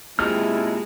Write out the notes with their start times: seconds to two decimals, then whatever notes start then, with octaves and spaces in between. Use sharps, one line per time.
0.19 G#3 A#3 C4 E4 F4 G4 A5 F6